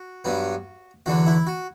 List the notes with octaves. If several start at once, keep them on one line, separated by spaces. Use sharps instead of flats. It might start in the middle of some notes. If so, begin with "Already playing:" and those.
Already playing: F#4
G2 F#3 B3
E2 D3 F#3 F#4
E4
F#4